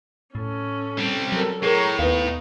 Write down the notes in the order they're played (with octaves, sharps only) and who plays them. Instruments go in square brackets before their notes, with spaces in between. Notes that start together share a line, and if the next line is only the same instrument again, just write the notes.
[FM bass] A2 [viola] C#4 A4
[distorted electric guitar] G3 C4
[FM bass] F#3 [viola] A4 A#4
[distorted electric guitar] A2 [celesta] G#4 A#4 [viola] C#5 A#5
[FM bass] D#2 [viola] B3 D#4 [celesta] B4 F5